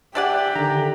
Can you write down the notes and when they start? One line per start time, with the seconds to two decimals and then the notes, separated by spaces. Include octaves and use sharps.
0.15 D4 G4 D5 E5 F#5 G#5
0.55 D3 D#3 A#5